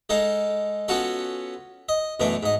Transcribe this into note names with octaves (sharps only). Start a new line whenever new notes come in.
G#3 D#4 A4 F5
B3 C#4 F4 F#4 A4
D#5
F#2 B2 E3 A3 D4
G#2 D#5